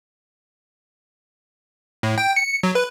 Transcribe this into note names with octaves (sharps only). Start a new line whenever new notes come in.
A2
G5
C#7
F#3
B4